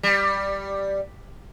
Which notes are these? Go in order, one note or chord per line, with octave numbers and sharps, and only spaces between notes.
G3